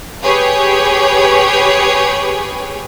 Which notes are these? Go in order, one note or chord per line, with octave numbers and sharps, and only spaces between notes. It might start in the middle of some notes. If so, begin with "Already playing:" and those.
G4 G#4 B4 C#5 G5